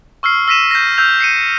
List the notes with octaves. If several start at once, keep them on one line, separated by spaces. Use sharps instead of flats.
C#6 E6 F6 C7
E6 A#6 B6 D#7 E7
G6 A#6
E6 F6 G6 F7
C7 C#7 D#7